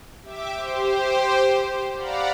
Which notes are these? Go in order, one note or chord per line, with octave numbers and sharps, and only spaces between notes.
G4 E5 D6
G4 C5
D5 F5 F#5 A#5 B5